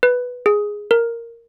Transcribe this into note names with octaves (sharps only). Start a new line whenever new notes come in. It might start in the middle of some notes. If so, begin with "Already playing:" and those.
B4
G#4
A#4